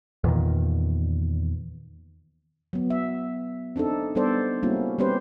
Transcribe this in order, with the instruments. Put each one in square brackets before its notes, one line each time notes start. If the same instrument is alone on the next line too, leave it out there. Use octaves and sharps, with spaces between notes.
[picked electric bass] E2 A#2 D#3
[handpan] F#3 B3
E5
C4 D4 D#4 A4
G3 B3 D4 A4 C5 D5
G3 A#3 C4 C#4 E4 F#4
G3 C4 C#4 G4 B4 C5